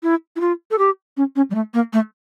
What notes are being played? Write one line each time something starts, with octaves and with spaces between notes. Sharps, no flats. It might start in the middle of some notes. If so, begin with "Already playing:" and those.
E4
E4
F4
A4
G4
C#4
C#4
G3
A3
A#3
A3